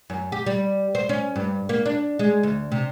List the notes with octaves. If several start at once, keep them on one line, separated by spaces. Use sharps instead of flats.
F#2
G4
G3
C5
C#4
G2
A#3
D4
G#3
D2
C3